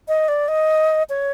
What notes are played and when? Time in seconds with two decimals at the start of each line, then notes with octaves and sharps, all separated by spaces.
0.08 D#5
0.28 D5
0.48 D#5
1.09 C#5